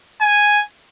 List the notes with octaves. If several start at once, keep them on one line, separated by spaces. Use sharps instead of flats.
G#5